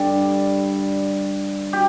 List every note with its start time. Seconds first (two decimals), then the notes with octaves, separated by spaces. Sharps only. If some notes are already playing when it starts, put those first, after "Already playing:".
Already playing: G2 D3 G3 D5
1.73 G4